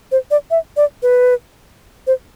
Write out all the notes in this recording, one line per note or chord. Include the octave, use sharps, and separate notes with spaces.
C5
D5
E5
D5
B4
C5